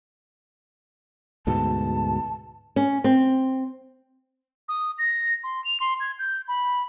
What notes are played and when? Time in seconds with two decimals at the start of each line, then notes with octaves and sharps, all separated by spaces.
1.47 D2 G#2 B2 A5
2.76 C#4
3.04 C4
4.69 D#6
4.98 A#6
5.44 C6
5.64 F7
5.80 C6
6.00 G#6
6.19 G6
6.48 B5